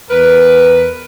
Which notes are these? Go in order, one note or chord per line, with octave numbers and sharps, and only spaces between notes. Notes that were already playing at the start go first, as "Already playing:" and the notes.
E2 A#4 B4